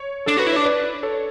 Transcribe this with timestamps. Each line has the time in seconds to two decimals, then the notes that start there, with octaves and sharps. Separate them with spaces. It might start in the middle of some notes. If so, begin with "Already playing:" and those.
Already playing: C#5
0.26 D4 A4
0.37 F#4 B4
0.47 E4
0.53 D4 C#5
0.66 B4 D5
1.03 A4 C#5